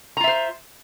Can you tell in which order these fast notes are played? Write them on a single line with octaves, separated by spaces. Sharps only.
A#5 F4 E5 C5